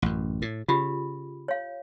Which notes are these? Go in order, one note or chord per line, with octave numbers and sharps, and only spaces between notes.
A1 F#2
A2
C#3 F4 G4 B5
C#5 F5